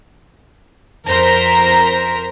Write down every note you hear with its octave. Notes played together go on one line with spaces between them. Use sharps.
F2 A#4 C5 A#5 B6